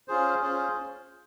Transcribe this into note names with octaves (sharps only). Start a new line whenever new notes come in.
C#4 F4 G#4 C5
C#4 F4 G#4 C5